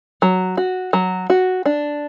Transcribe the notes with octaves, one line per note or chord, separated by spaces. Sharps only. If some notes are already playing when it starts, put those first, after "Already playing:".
F#3
F#4
F#3
F#4
D4